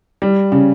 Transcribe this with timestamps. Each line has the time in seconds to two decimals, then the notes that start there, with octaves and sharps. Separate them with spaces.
0.22 G3
0.52 C#3